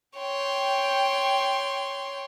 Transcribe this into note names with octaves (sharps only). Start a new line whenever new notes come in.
C#5 G5 C6